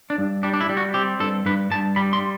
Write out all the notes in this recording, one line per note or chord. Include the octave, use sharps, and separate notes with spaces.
D4
G2
G3 D4
D4
E4
G3
F#4
C4 G4
G2 A4
G2 B4
G2 A5
G3 B5
C6